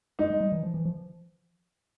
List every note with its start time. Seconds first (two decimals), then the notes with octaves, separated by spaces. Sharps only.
0.19 G#3 D#4
0.30 G#3
0.41 G3
0.52 E3
0.63 F3
0.74 E3
0.85 F3